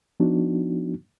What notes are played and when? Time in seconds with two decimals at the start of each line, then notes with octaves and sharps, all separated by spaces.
0.20 F3 B3 D4 D#4 F#4